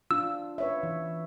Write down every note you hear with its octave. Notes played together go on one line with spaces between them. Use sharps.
D4 F4 E6
B4 C#5 E5
E3